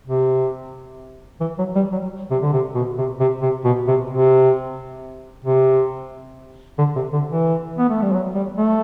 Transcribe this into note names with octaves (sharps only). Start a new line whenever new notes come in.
C3
E3
F#3
G3
F#3
C3
D3
C3
B2
C3
C3
C3
B2
C3
C3
C3
D3
C3
D3
E3
B3
A3
G3
F#3
G3
A3